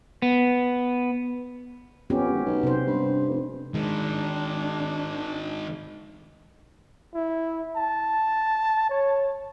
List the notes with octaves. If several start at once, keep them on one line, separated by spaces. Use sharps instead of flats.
B3
F2 B3 C#4 G4
G#1
B1
C3 C5
G2
F1
D#3 G#3 D4
E4
A5
C#5